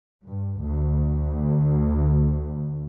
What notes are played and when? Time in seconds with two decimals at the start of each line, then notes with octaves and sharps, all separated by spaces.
0.26 G2
0.62 D2